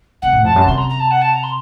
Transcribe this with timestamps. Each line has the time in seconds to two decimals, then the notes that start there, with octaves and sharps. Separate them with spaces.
0.22 C3 F#5
0.33 A2
0.44 F2 A5
0.56 F#2
0.66 C3 C6
0.78 A#5
0.89 A#5
1.00 A5
1.11 F#5
1.21 A5
1.33 A#5
1.43 C6